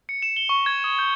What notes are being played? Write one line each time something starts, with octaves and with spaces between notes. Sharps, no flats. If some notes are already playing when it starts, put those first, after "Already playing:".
C#7
E7
G7
C#6
G#6
D#6
G6